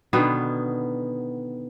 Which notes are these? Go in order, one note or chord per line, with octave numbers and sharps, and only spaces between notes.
B2 D3 D#3 B3